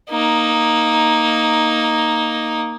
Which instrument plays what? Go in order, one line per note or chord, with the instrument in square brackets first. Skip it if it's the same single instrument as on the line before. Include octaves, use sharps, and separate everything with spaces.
[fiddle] A#3 D#4